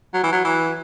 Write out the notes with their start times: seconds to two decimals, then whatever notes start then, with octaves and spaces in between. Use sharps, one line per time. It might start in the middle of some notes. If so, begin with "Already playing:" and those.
0.13 F#3
0.23 E3
0.32 F#3
0.44 E3